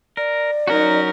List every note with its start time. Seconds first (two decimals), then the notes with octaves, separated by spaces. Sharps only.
0.17 A#4 D5
0.68 F#3 C#4 D#4 F#4 A#4